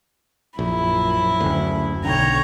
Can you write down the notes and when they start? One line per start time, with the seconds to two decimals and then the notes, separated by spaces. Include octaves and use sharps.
0.59 A#1 F#2 E4
1.40 F#1 D2
2.04 B1 D3 C#5 G5 A#5